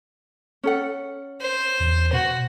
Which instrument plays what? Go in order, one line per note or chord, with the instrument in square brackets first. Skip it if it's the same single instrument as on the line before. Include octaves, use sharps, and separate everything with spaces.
[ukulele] C#4 A4 F#5
[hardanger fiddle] C5
[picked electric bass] E2
[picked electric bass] B2 B3 [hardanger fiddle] F#4